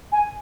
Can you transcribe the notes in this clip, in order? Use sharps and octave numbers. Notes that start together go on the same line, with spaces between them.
G#5